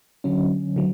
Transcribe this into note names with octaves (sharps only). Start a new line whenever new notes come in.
D3 F#3 C#4
D3 F#3